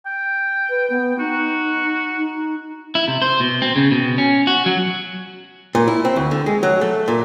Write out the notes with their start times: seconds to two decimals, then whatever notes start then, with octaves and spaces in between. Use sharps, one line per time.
0.06 G5
0.69 B4
0.90 B3
1.19 D#4 F#4
2.18 D#4
2.95 E4
3.08 C3
3.22 C5
3.40 B2
3.62 C4
3.76 C#3
3.91 B2
4.18 C#4
4.47 F#4
4.66 F#3
5.75 A#2
5.88 E4
6.05 C4
6.16 D2
6.31 D3
6.46 G#3
6.63 F#3
6.81 A3
7.08 A#2